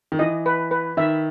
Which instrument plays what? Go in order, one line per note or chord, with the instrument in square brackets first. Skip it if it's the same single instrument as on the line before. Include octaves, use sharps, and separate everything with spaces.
[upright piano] D#3
[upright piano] E3 [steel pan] D#5
[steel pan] B4
B4
[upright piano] D#3 [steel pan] E5